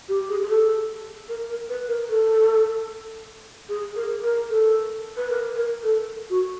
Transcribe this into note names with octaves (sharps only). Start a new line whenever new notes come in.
G4
G#4
G#4
A4
A#4
A#4
B4
A#4
A4
G#4
A#4
A#4
A4
B4
A#4
A#4
A4
F#4